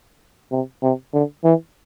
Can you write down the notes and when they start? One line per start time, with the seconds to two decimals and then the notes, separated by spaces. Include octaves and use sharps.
0.51 C3
0.82 C3
1.13 D3
1.44 E3